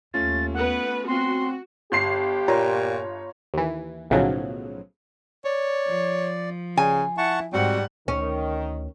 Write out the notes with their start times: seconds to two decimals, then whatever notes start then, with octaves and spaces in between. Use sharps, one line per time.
0.14 D#2 A3 C#4 F4 A6
0.54 B3 B4 F#5
1.07 C4 F#4 C6
1.92 G1 G4 C6 C7
2.48 A#2 F4 C#5 A#5
3.54 D#2 E3
4.10 B1 A2 C#3 F3 F#3
5.45 C#5 D5
5.87 F3
6.77 C#3 G#5
7.18 E4 F#5 A5 C#6
7.53 G#2 G3 C4 F#4 F#5
8.08 D2 D#3 C#4